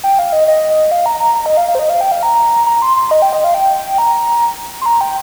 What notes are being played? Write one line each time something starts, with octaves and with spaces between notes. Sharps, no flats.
G5
F5
D#5
D#5
F5
A#5
A#5
A#5
D#5
F5
F5
C5
D#5
F5
G5
F5
A#5
A#5
C6
C6
D#5
G5
D#5
F5
G5
A#5
C6
A#5
G5